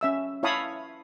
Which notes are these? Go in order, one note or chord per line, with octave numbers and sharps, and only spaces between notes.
C#4 E5 E6
E4 C#5 F5 A5 B5 D#6